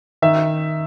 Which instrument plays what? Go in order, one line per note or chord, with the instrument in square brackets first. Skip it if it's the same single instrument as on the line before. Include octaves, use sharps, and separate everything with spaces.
[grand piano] D#3 E5